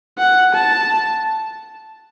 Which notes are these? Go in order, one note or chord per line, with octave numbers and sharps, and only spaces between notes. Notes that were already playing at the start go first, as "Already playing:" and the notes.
F#5
A5